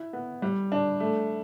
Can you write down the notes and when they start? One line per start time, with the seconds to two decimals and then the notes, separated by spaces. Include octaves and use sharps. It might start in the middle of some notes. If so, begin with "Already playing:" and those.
Already playing: E4
0.13 B3
0.42 G3
0.72 D4
1.00 A3